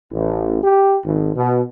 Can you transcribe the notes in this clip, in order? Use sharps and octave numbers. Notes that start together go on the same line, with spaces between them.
A1
G4
G#1
B2